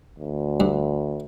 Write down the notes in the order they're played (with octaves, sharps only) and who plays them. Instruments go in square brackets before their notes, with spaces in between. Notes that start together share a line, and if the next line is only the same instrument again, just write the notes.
[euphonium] D2
[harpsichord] G2